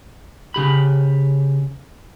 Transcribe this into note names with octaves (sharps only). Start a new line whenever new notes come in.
C#3 G4 B5